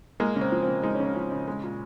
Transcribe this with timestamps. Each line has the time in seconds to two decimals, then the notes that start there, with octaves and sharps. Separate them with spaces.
0.20 G#3 A#3
0.36 C#3
0.41 C4
0.52 F3
0.63 C4
0.68 C#3
0.83 G#3 D#4
0.94 C#4
1.00 C#3 C4
1.15 F3 C#4
1.32 C#3
1.48 G#3
1.63 A#2